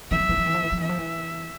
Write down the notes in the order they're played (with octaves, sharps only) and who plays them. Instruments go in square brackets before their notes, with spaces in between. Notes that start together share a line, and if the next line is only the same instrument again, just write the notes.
[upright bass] E3 [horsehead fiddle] E5
[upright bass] F3
E3
F3
E3
F3
E3
F3
[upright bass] E3 [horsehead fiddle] E5
[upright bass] F3
E3